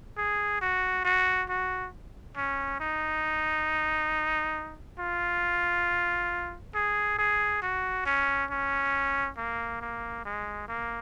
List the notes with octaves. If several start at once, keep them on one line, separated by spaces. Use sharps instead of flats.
G#4
F#4
F#4
F#4
C#4
D#4
F4
G#4
G#4
F#4
C#4
C#4
A#3
A#3
G#3
A#3